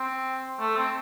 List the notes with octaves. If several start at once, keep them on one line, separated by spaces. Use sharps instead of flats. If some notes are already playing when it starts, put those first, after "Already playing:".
Already playing: C4
A3
C4